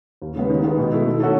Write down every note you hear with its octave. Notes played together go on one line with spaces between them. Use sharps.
D#2
C#3 G#3 B3
D#3
G#3 B3
B2
A3 E4
D#3
A3 C#4 F#4 A4